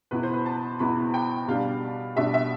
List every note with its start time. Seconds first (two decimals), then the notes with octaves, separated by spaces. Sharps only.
0.11 E2 B2 B3 E4 B4
0.23 C5
0.33 B4
0.46 A5
0.79 E2 B2 B3 E4 B5
1.14 G5
1.48 B2 G3 D4 F5
2.16 B2 G3 D4 E5
2.34 E5